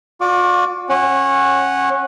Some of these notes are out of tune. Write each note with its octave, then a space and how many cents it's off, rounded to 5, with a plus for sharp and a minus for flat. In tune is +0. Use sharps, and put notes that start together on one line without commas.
F4 +45 D5 +0 D6 -30
C#4 -20 F#5 +0